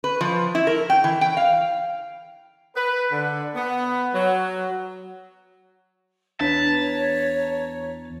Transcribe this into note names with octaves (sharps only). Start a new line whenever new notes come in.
B4
F3
E4
A#4
G5
E3
G5
F5
B4
D3
B3
F#3
E2 D4 B4 C#5 A5 A#5